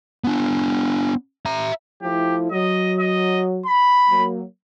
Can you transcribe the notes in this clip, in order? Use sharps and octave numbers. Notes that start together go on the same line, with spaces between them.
B3 D4
E5 A#5
F3 A3 E4 G4
F#3 D#5
D#5
B5
F#3 A#3